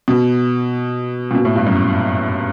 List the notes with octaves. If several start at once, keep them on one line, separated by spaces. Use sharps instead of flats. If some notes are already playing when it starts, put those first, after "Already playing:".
B2
A#2
B2
A2
G2
F#2